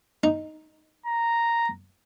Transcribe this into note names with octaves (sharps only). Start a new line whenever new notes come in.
D#4
A#5